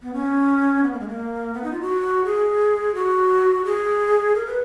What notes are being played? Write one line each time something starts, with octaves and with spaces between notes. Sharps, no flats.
B3
C#4
B3
A#3
G#3
A#3
B3
D#4
F4
F#4
G#4
F#4
G#4
A#4
B4